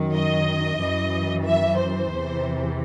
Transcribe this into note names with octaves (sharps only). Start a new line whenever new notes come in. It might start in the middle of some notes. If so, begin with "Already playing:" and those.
Already playing: F#2 D#3
D#5
F#2 E3
E5
C5
E2 C3 E3